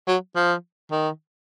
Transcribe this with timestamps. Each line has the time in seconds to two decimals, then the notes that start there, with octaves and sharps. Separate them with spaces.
0.08 F#3
0.36 F3
0.92 D#3